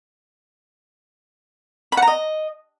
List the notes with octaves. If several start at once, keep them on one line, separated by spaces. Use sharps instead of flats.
B5
F#5
A#5
D#5